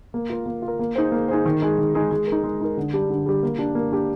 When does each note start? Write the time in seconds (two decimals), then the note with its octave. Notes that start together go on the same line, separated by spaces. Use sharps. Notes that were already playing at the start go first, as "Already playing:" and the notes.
0.14 A#3
0.30 F4 A#4
0.46 A#3
0.62 F4
0.68 A#4
0.79 A#3
0.95 D#4 G#4 C5
1.12 A#3
1.28 D#4 G#4 C5
1.45 D#3
1.62 G#3 D#4 G#4
1.78 D#3
1.94 G#3 D#4 G#4
2.11 G#3
2.27 A#4
2.32 D#4
2.44 G#3
2.61 D#4 A#4
2.77 D3
2.94 G3 D4 G4
3.10 D3
3.26 G3 D4 G4
3.43 A#3
3.59 D4 G4
3.75 A#3
3.92 D4 G4